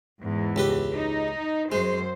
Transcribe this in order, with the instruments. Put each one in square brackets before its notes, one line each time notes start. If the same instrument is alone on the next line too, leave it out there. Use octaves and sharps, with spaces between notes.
[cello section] E2 G#2
[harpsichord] C#2 G4 B4
[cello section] D#4
[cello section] F#2 C5 [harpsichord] G#3